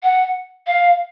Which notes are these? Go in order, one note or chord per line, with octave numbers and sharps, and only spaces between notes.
F#5
F5